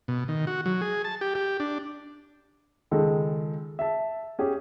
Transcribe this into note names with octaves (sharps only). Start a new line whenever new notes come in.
B2
D#3
F#4
F#3
G#4
A5
G4
G4
D4
C#2 D#3 G#3 A4
E5 A5
C#4 G4 G#4